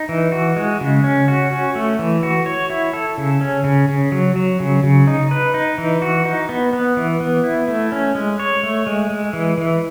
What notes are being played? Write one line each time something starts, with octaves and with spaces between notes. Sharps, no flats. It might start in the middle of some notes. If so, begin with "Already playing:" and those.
Already playing: D#4
E3
F#4
G#3
C#3
C#4
F#4
C#4
A3
E3
F#4
C#5
E4
A4
C#3
C#4
C#3
C#3
F#3
F#3
C#3
C#3
D#4
B4
D#4
E3
F#4
D#4
B3
B3
E3
B3
E4
A3
C#4
G#3
C#5
A3
G#3
G#3
E3
E3